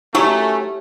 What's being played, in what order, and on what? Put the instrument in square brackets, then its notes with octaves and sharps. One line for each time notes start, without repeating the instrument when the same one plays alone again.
[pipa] D#3 F#3 C#4 [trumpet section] A3 [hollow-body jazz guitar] E4 G4 C#5